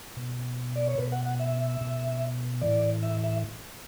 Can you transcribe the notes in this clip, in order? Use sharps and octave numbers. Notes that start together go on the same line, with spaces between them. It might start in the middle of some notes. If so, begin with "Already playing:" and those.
B2
D5
C#5
B2 B4
F#5
F#5
E5
B2
A2 E3 D5
E5
E5